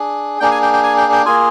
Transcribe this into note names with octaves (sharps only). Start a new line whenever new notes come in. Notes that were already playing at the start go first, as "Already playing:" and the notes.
Already playing: D4 G#4
A#3 D4 G#4 G5
G#5
G5
G5
G#5
G5
G5
A#3 F4 G#4 G#5